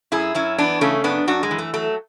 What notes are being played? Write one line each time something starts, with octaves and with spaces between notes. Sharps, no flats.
F#2 E4 G#4
F#2 C#4 E4
E3 B3 D4
C#3 A3 C#4
F#2 B3 D4
F#2 D4 F#4
G#3
E3
A3
F#3 A3